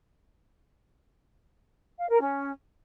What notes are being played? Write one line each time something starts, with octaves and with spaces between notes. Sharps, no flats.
F5
A#4
C#4